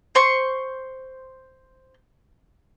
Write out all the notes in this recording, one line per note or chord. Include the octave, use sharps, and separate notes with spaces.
C5 C6 C#6